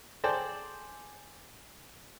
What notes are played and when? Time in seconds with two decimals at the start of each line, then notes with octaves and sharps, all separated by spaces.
0.24 G#4 A4 C5 D5 G5 A5